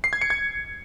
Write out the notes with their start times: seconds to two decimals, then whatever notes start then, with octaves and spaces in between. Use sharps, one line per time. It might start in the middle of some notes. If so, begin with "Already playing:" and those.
0.04 C7
0.13 G#6
0.21 C#7
0.30 G#6